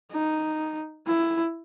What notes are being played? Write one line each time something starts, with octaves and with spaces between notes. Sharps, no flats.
D#4
E4